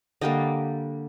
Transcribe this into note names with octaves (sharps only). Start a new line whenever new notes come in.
D3 G3 A#3 D#5 G5